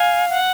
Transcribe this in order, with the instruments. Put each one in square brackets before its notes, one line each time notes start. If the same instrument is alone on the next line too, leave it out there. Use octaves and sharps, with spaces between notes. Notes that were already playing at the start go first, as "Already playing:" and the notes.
Already playing: [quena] F5 [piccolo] G#5
[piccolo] F#5